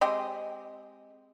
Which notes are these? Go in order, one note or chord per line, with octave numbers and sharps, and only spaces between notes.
G#3 C4 G4 D#5